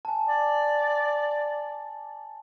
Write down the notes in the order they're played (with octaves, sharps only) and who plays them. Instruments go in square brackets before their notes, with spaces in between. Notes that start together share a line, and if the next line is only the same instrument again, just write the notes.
[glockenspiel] G#5 A5
[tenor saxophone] D5